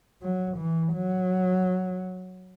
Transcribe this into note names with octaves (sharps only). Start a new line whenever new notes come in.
F#3
E3
F#3